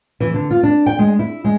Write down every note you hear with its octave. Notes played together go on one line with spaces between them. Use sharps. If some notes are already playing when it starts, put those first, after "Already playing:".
E3
D3
F4
D4
G5
G#3
E4
G#3